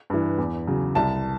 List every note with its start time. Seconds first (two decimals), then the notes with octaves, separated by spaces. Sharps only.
0.10 G2 E3
0.38 E2
0.67 C#3 F#3
0.95 C2 A5